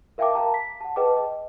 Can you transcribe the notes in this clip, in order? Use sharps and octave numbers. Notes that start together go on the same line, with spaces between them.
A#4 E5 F5 G5 A5 D6
A#4 F5 A5 A#5
B6
F#5 A5
G#4 B4 D#5 G5 A5 D6
D#5